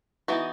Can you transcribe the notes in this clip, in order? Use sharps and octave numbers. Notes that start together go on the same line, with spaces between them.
E3 B3 D#4 F#4